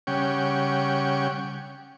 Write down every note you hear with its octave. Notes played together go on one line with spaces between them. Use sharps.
C#3 G3 C#4 F#5 G5 C#6